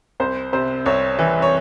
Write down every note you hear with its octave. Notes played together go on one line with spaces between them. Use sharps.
C2 C5
C3 C5
C2 C#5
E3
C#5